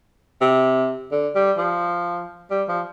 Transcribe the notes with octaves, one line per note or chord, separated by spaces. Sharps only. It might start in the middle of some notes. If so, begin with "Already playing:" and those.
C3
D3
G3
F3
G3
F3